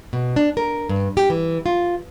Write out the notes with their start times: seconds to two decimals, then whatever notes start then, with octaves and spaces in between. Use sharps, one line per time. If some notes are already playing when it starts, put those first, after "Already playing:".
0.13 B2
0.36 D4
0.57 A#4
0.89 G2
1.17 G4
1.30 E3
1.66 F4